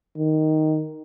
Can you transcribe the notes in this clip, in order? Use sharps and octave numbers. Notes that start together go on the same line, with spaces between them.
D#3